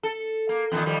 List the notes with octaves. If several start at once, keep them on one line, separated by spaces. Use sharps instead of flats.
A4
A#3
E2 A#2 D#3
D#3 F3 G3